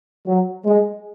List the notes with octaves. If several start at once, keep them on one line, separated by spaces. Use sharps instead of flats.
F#3
G#3